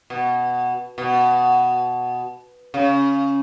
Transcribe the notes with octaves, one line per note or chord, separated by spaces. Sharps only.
B2
B2
C#3